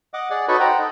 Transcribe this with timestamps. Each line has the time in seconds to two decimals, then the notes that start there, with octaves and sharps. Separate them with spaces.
0.14 D#5 F#5 D6
0.30 G#4 D5 F#5
0.48 D#4 F#4 A4 B4 C#5
0.60 C5 F#5 G5 A#5
0.78 D#4 A4